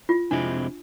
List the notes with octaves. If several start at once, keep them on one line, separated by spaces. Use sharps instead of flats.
F4
F2 C3 G#3 C4 D4 E4